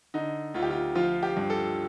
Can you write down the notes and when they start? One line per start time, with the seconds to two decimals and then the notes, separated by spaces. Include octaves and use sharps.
0.14 D3 D#4
0.54 D2 F4
0.62 G4
0.70 F4
0.95 F3 F4
1.23 G4
1.37 G2
1.50 A4